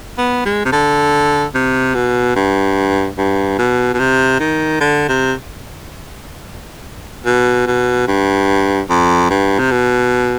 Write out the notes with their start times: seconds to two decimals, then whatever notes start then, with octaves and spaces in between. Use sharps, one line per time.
0.18 B3
0.45 G#3
0.65 C3
0.72 D3
1.55 C3
1.95 B2
2.36 G2
3.18 G2
3.59 B2
3.94 B2
3.99 C3
4.40 D#3
4.81 D3
5.09 C3
7.25 B2
7.67 B2
8.08 G2
8.90 F2
9.30 G2
9.59 C3
9.71 B2